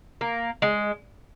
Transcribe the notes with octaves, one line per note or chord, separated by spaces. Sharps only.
A#3
G#3